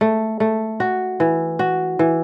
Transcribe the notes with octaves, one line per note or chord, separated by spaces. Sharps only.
A3
A3
F#4
E3
F#4
E3